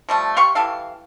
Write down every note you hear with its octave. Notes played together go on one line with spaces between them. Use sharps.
F3 G3 A3
G4 F5 C6 C#6
E3 G4 A4 F5